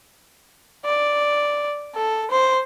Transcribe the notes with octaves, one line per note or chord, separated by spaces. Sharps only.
D5
A4
C5